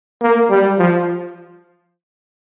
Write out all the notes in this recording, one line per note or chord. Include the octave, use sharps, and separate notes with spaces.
A#3
G3
F3